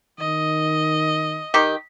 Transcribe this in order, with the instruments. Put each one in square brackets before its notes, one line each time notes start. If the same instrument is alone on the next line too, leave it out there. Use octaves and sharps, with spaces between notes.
[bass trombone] D#3 [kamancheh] D#5
[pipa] D#3 G4